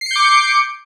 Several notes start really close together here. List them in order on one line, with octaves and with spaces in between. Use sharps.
C7 C#7 G6 D6